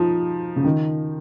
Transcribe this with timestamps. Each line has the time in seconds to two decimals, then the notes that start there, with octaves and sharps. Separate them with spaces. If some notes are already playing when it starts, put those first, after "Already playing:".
Already playing: F3 D#4
0.56 C#3
0.64 D#3